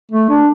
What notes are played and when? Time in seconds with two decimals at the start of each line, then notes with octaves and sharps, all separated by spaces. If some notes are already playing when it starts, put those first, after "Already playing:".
0.11 A3
0.29 D4